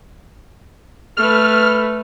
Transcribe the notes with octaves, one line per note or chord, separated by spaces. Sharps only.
A3 B4 F6